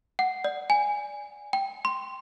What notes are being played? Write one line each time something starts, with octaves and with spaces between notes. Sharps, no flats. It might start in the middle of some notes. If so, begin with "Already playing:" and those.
F#5
D5
G#5
G5
C6